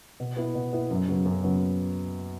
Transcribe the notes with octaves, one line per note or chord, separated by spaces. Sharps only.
B2
B3 E4
B2
B3 E4
F#2
C#3 F#3 B3
F#2
C#3 F#3 B3